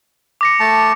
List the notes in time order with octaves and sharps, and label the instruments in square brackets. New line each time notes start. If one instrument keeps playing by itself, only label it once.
[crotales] D6 A#6 C#7
[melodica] A3 A5